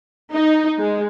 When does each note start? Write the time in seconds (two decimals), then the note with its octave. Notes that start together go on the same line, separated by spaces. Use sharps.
0.33 D#4
0.79 G#3